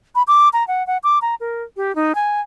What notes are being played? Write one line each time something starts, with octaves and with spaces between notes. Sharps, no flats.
B5
D6
A#5
F#5
F#5
D6
A#5
A#4
G4
D#4
G#5